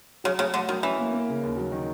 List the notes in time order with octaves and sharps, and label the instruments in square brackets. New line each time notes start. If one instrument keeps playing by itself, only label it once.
[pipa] C#3 [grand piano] F#3
[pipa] C#3 [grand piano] A3
[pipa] D3 [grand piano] F#3
[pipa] D#3 [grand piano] F#3
[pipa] E3 [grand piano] C#4
[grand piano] A#3
A#3
C#3
D#2
F#3
D#3